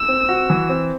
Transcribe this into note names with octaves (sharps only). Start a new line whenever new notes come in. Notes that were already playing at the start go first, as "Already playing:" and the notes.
Already playing: E6
C4
F#4
E3
C4